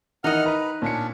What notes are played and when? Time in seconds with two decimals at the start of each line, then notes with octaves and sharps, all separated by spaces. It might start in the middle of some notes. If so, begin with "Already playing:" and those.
0.24 D#3 E3 D#4 D#5 F#5 F6
0.46 B4 A#5
0.82 A#2 C#4 D4 C#7